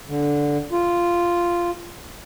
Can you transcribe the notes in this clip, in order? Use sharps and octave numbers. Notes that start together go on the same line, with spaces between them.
D3
F4